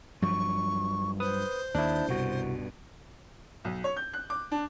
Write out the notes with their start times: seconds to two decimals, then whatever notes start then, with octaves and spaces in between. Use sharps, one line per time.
0.22 G2 F3 F#3 C#6
1.20 B4 C5 D#6
1.75 D#2 D4 E4
2.08 C2 G2 B2 F#4
3.65 B1
3.84 C#5
3.97 G6
4.13 F#6
4.30 D6
4.52 D4